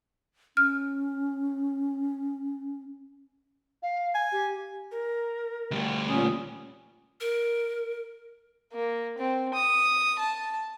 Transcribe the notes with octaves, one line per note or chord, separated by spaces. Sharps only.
C#4 F6
F5
G#5
G4
A#4
D2 G3
A#2 C#4 D#6
A#4
A#3
C4
D#6
A5